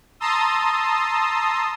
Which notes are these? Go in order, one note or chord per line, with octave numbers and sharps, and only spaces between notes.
A5 A#5 C6 D#6 E6